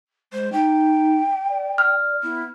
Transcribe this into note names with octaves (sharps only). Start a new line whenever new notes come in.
G#3 C5
D#4 G5
D5
F6
B3 E4